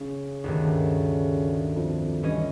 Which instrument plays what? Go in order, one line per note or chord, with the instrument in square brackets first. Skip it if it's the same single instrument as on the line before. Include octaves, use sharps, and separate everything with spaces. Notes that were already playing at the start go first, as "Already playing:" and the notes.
[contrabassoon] C#3
[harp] D2 G2 D#3
[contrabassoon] F2
[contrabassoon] G2 [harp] E3 C#4 D#5